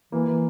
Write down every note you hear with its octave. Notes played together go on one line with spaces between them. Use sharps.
E3 A#3
E3